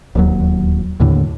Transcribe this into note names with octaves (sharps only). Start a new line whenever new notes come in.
D1 D#2 F#3
D#2 A2 D3